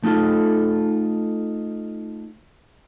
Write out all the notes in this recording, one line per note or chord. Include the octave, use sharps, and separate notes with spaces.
A3 D#4 F4 A4